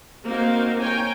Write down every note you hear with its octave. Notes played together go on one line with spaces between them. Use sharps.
A#3 C4 D#4 F#4 A#4 F5
C#5 G5 G#5 A#5